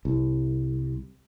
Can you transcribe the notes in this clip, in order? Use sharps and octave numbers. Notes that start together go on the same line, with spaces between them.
C2